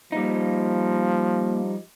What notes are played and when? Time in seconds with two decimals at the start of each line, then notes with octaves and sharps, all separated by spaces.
0.12 F3 G3 A#3 D#4